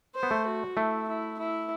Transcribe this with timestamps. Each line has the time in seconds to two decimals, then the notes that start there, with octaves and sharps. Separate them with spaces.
0.16 C5
0.23 B3
0.31 A3
0.46 F#4
0.77 A3 E4
1.08 E4
1.39 E4